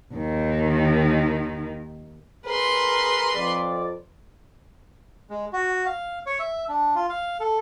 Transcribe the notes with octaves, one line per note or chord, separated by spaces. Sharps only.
D#2 D#3
G#4 A#4 B4 C6
F2 D5
G#3
F#4
F5
C#5
E5
D4
F4
F5
A4